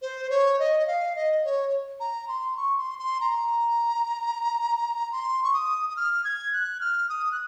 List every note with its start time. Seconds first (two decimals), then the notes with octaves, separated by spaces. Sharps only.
0.02 C5
0.30 C#5
0.59 D#5
0.79 D#5
0.87 F5
1.16 D#5
1.44 C#5
2.00 A#5
2.28 C6
2.56 C#6
2.78 C6
2.99 C6
3.21 A#5
5.12 C6
5.44 C#6
5.53 D#6
5.90 D#6
5.97 F6
6.24 G#6
6.53 F#6
6.81 F6
7.09 D#6
7.32 F#6